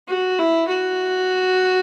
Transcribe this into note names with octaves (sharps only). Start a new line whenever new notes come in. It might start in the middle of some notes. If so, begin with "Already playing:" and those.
F#4
E4
F#4